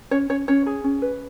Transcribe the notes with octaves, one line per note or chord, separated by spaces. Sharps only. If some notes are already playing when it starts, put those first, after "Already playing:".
C#4 C#5
C#4 C#5
C#4 C#5
G#4
C#4
B4